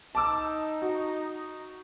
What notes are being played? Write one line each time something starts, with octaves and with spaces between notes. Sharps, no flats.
D#4 A5 D6 E6
F#4